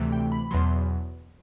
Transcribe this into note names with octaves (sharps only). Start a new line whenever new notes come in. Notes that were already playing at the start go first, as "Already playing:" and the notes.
Already playing: D2 C3 E3 A3
G5
B5
E2 B2 F#3 C6